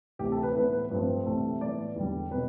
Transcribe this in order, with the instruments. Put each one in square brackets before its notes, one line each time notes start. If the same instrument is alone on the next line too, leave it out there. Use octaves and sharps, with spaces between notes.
[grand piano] D2 C3 E3 A3 G4
A4
B4
A2 E3 B3 B4
B4
G2 F3 A3 C4
C2 C3 E3 A3
A2 E3 B3 D5
E2 D3 G3
B2 G3 B3 B4